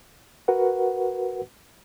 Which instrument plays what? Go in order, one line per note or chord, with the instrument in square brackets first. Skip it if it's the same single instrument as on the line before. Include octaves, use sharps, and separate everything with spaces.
[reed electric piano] F#4 A#4 B4 F#5